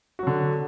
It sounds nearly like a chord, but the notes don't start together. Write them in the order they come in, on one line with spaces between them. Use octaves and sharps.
F#4 F#3 D3